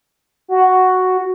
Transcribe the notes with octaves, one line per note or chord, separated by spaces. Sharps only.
F#4